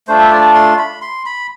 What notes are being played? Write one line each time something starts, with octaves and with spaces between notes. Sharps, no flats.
A3 D4 F4 C5
E5
D5
C6
B5
C6
B5